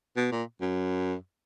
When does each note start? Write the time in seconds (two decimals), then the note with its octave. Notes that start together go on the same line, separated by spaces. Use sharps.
0.17 B2
0.32 A#2
0.61 F#2